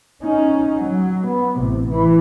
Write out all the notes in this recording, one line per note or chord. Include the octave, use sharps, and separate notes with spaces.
C#4 D#4
F#3
B3
A1 C3
E3